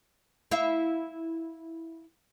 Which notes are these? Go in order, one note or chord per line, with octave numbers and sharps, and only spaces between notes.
E4 E5 F5